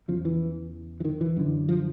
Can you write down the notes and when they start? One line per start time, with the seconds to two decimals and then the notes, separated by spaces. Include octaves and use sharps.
0.08 E2 C#3 F3
0.25 E3
1.00 E3
1.05 D#3
1.21 E3
1.37 F#2 D3
1.69 F3